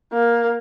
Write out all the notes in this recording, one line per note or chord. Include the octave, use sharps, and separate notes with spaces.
A#3